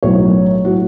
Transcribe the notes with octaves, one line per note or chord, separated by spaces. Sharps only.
B1 A2 F#3 C#5
A2 F#3 F#4